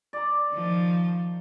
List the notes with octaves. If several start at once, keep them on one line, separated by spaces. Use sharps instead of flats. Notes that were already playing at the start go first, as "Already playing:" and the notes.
D5 A#5
D#3 F3